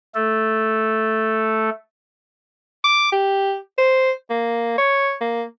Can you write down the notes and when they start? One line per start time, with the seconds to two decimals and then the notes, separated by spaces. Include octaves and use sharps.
0.15 A3 A4
2.84 D6
3.12 G4
3.78 C5
4.30 A#3
4.78 C#5
5.21 A#3